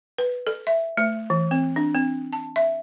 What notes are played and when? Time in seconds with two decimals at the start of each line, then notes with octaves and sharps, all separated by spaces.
0.18 B4
0.47 A4
0.67 E5
0.97 A3
1.30 E3
1.51 C4
1.76 D4
1.95 C4
2.33 A5
2.56 E5